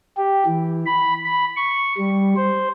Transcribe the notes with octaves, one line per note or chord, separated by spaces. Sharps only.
G4
E3
B5
B5
C#6
G3
C5